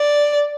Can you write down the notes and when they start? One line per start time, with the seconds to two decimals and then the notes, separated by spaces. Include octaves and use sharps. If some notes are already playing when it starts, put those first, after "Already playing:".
Already playing: D5